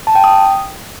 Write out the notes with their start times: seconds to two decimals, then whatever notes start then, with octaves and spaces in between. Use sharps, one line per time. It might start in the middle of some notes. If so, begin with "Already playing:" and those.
0.07 A5
0.15 G5
0.24 D#6